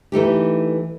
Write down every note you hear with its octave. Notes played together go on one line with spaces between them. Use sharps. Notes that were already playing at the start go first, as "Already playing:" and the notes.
E3 A3 D#4 G4